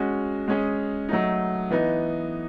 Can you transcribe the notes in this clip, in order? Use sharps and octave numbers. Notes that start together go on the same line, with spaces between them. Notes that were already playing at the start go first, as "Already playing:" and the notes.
Already playing: G#3 C#4 F#4
G#3 C#4 G#4
F#3 A3 D#4
E3 B3 D#4